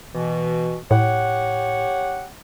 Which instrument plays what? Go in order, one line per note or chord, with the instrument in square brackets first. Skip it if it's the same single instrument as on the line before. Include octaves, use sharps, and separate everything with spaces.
[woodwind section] B2 E3
[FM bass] A2 [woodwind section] G4 C#5 F#5